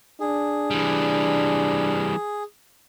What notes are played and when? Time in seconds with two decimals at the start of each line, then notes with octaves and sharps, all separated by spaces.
0.20 D4 G#4
0.71 E3 G3